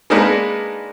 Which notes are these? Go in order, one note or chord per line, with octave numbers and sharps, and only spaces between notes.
G#3 A#3 D4 D#4 A#4 B4